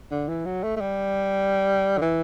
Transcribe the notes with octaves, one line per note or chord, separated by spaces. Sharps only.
D3
E3
F#3
A3
A3
G3
D3
E3